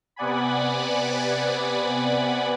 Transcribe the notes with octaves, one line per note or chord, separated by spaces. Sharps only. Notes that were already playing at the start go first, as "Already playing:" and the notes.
C3 B3 D5 F#5 G#5 B5